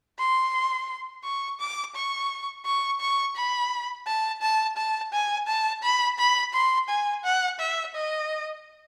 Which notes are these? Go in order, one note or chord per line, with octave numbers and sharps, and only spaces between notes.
C6
C#6
D6
C#6
C#6
C#6
B5
A5
A5
A5
G#5
A5
B5
B5
C6
G#5
F#5
E5
D#5